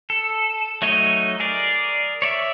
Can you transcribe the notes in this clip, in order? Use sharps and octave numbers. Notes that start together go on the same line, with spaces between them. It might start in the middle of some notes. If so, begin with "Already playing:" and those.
A4
F#3 A3 D#4 C#5 D#5
G#4 A#4 D5
C#5 D5 E5